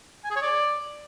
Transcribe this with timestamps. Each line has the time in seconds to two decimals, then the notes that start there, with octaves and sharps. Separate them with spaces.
0.24 G#5
0.30 G#4
0.36 C#5
0.42 D5